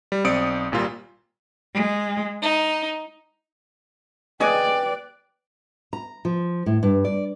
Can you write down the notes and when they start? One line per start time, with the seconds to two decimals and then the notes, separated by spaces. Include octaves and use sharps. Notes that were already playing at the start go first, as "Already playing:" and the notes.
0.12 G3
0.24 B1 C4 D5 D#6 C#7 D7
0.72 G#1 A#2 G3 F4
1.73 G#3
2.41 D#4
4.40 G#4 B4 D5 D#5 G5 G#5 F#6
5.93 A#5
6.25 F3
6.66 A2
6.83 G2
7.05 D5